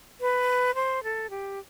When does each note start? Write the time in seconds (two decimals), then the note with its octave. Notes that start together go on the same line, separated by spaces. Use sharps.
0.21 B4
0.75 C5
1.04 A4
1.30 G4